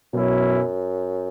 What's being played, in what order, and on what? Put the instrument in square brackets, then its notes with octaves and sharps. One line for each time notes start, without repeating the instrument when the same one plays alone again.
[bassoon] F#2 [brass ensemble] B2 F#3 C#4 E4